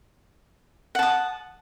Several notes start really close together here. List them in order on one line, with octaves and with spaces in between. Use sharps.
F#5 A5 D#6